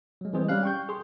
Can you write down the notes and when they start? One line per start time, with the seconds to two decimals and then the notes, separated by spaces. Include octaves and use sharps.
0.21 F#3 G#3
0.33 E3 G3 G#3 C4 G#4 C5
0.49 G3 C#4 F5 F#6
0.63 G5 C#6 G6
0.89 G#4 C6